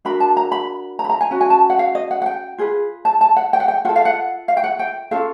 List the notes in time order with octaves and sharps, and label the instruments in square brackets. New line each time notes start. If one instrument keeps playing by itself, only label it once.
[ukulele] D4 F#4 A#4 B5
A5
A#5
B5
A#5
B5
A#5
G#5
C#4 F#4
G#5
A5
F#5
F5
D#5
F#5
F#5
G5
F4 G#4 B4
A5
A5
F#5
G5
F#5
G5
F4 F#5
A4
F5
F#5
F5
G5
F#5
G5
C#4 F4 A4 F5